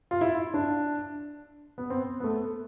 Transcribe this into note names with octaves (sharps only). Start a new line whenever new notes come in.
F4
E4
D4
B3
C4
B3
A3